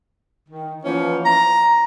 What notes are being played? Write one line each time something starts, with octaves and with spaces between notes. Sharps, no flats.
D#3
E3 F3 A#3 B3 C#4
A#5